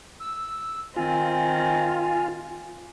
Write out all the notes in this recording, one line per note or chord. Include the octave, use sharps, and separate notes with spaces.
E6
D#3 C4 F4 G#5